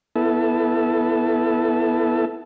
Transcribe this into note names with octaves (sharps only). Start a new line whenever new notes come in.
B3 E4 A4